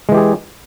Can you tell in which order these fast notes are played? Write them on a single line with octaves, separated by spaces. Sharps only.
G#3 E3 G4 G#4